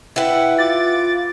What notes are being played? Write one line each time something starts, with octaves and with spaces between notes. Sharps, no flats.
E4 G4 B4 F#5
F4 D6 A6